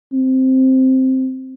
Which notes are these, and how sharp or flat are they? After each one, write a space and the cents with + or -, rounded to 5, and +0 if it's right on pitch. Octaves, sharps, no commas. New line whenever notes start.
C4 +0